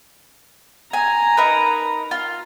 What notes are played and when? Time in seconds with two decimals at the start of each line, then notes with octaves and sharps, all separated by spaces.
0.93 G#5 A#5
1.37 D#4 A#4 B4
2.11 F4